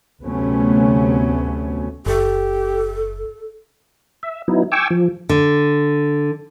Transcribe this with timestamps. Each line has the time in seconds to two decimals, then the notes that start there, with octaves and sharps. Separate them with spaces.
0.23 D2 C3 F#3 A3 B3 C#4
2.06 F#1 G4 A4
4.23 E5
4.48 F#3 B3 D#4 E4
4.72 G5 G#5 C#6 D6 E6
4.90 F3
5.29 D3